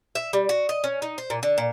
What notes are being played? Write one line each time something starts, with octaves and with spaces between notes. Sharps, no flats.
E5
G3
F#4
D#5
C#4
D#4
C5
A#2
D3
A#2